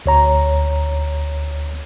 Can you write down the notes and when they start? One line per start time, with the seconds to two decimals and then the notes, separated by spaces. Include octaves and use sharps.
0.06 D2 C#5 A#5